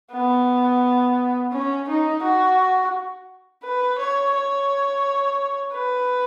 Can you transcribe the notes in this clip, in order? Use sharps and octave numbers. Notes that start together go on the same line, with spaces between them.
B3
C#4
D#4
F#4
B4
C#5
C#5
B4